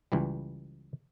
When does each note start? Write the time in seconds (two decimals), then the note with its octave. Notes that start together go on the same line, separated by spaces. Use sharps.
0.12 C#2 E3 G3